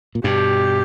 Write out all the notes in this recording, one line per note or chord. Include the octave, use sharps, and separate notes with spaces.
A#2
G2 B2 G4